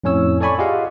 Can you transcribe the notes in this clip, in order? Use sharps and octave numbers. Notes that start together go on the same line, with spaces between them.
F2 A2 C#4 C#5 E6
A4 C#5 D5 G#5 B5 C#6
F4 G4 G#4 D#5 F5 F#5